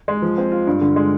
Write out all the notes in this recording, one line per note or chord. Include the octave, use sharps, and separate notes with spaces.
G#3
F3
C4
F4
G2
D3
G#3